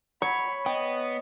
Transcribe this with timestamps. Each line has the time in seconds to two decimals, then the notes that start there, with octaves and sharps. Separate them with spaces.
0.22 F#3 C#5 B5
0.66 B3 D#5 G5